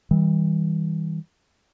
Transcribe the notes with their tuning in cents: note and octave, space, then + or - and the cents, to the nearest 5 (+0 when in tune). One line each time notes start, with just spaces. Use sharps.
E3 -45 G3 +0